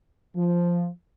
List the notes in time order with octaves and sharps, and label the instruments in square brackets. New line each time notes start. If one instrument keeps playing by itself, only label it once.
[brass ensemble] F3